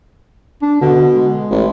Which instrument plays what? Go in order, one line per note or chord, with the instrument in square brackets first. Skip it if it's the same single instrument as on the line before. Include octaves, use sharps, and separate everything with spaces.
[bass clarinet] D4
[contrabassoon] B2 [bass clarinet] D3
[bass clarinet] G#3
[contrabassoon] A1